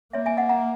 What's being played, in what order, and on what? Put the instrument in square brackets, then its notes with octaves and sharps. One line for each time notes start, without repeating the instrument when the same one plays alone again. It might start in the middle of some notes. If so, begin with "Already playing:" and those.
[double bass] A#3 [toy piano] C#5 E5
[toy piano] E5 G#5
D#5 F#5
F#5 A#5